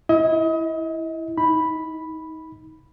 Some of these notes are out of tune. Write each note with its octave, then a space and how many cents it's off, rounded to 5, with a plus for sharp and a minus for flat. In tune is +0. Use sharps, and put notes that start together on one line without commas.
E4 +0 D#5 +35
D#4 +25 B5 +0